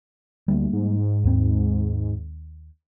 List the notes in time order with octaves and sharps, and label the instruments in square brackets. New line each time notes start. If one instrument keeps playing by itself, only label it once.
[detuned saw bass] D2 [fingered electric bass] G3 A#3
[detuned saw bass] G#2
[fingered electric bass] D#2 C4